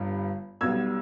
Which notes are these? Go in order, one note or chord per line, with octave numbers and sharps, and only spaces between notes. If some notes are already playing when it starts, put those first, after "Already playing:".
Already playing: G1 G2 G3
B1 B2 G3 E6 G#6